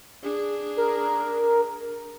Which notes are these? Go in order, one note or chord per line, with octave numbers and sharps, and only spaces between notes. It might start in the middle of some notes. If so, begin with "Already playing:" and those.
D4 G#4
A#4